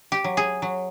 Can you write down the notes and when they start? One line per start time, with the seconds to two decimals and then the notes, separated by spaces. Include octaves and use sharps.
0.12 G4
0.24 F#3
0.37 G#4
0.62 F#3